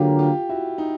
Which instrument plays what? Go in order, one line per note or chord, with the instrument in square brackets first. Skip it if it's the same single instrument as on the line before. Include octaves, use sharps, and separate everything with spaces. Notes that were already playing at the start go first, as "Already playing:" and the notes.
Already playing: [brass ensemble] D3 F#3 A#3 [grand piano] F4 G4
[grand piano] F4 G4
E4 F#4
D#4